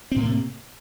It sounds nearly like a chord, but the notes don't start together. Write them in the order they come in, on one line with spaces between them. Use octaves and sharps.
C4 A2 A#3 C3